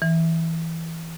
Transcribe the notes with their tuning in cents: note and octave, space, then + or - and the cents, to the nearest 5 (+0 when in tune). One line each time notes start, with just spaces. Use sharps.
E3 -10